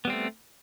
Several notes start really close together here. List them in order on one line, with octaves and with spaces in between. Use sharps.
B3 G3 C4 A3